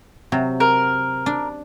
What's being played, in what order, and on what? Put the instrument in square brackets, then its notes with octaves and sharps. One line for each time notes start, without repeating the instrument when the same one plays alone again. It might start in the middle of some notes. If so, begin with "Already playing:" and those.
[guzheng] C3 F#3
[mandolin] A#4
[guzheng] D4